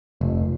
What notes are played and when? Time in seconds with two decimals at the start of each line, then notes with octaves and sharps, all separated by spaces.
0.21 F1